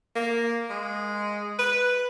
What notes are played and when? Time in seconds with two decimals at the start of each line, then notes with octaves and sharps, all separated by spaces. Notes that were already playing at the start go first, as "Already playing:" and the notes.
0.15 A#3
0.70 G#3
1.59 B4